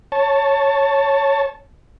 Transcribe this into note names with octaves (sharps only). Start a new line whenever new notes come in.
C#5 A5